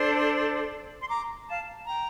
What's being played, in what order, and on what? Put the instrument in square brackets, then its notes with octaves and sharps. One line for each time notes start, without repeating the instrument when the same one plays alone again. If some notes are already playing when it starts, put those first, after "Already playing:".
Already playing: [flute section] D4 A4 C5
C6
A#5 D6
F5 A5
G5 A#5